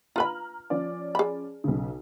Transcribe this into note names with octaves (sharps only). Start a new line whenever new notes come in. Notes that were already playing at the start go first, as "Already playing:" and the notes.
F4 B4 A#5 B5 F6 F#7
F3 C#4 D5
G#4 B5
B1 C#3